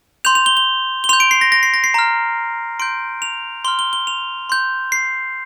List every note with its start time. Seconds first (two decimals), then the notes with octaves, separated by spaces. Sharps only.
0.25 C6 G6 F7
0.35 F7
0.46 G7
0.57 G7
1.04 G7
1.09 C6 G6 F7
1.20 D7
1.31 C7
1.41 A#6
1.52 A#6
1.63 C7
1.74 A#6
1.84 C7
1.94 A#5 F6
2.80 C6 G6 D7
3.22 F7
3.65 C6 G7
3.68 F6
3.79 G7
3.93 G7
4.07 F7
4.49 C6 G6
4.92 C7